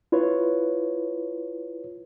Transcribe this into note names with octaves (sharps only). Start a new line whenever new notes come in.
E4 F4 B4 C#5